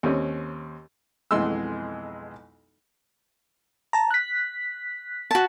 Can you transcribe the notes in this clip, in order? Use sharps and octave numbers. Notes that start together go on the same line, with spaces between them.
D#2 C4 C#4
B1 F2 E3 G#3 C6 E6
A5 A#5
F#6 B6
F#4 A5